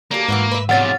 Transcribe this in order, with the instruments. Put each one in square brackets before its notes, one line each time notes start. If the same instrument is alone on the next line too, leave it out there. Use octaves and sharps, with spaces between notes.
[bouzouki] D3 F#3 G4 [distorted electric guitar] A#3
[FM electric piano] G#2 [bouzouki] E3 F#4 B4
[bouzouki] B4 E5
[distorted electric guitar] E2 C3 [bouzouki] C#5 D5 F5 [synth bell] F#5 A6